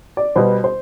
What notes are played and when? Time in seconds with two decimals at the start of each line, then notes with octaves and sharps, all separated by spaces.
0.17 D5
0.36 B2 G3 B3 C5
0.64 C5